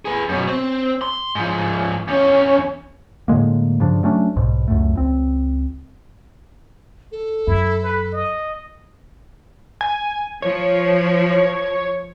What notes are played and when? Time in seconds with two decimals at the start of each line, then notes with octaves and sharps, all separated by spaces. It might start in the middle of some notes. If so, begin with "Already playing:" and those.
0.05 G#4 B4
0.29 F#2 B2
0.47 C4
1.02 C6
1.35 G#2 F3
2.08 E2 C#4
3.28 A2 D3 G#3 A#3
3.80 G2 C#3 F3 D4
4.03 F#3 A3 C#4 D4
4.36 B1 G#2 B2
4.68 C#2 F#2 A3
4.95 C#2 C4
7.12 A4
7.47 F#2 E4
7.83 B4
8.13 D#5
9.81 G#5
10.42 F3 C#5